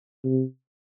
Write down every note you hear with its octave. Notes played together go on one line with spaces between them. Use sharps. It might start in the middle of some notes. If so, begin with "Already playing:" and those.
C3